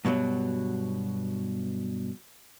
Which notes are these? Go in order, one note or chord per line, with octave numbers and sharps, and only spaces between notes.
G2 B2 D3 F#3